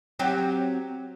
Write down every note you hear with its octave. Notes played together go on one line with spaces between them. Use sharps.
F#3 C4 G4